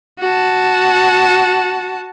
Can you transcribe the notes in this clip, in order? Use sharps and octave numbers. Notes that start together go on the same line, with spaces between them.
F#4 A5